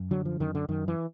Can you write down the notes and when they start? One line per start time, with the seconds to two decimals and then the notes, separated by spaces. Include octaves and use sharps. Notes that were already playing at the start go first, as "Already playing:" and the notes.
Already playing: F#2
0.11 D3 F#3
0.25 F3
0.40 F#2 D#3
0.55 D3
0.69 F#2 D#3
0.88 E3